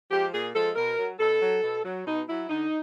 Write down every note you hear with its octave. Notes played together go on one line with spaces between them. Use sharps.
F3 G#3 G4
A#2 G#4
F3 G#3 A4
B2 A#4
F#3
B2 A4
F#3
B2
F#3
B2 D#4
F#3 E4
D3 D#4